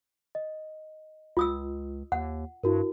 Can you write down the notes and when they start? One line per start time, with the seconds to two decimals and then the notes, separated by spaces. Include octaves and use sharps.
0.35 D#5
1.37 C#2 F4 D#6 E6
2.12 D#2 F#5
2.63 G2 E4 F#4 A#4